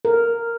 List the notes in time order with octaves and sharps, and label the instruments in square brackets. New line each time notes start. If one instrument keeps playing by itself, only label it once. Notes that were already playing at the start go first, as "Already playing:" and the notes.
[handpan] A#4